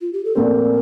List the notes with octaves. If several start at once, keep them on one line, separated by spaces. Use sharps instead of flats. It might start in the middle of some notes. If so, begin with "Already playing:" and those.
F4
G4
A4
A#1 A#2 A3 C4 A#4